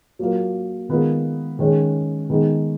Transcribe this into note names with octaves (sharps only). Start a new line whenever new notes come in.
F#3 A#3 F4 A#4
D#3 G#3 B3 F4 A#4
D#3 G#3 C#4
D#3 G#3 B3 D#4